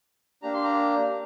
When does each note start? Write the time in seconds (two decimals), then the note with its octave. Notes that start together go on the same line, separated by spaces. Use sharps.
0.42 A#3 D4 G4 A#5
0.54 C6
0.64 A#5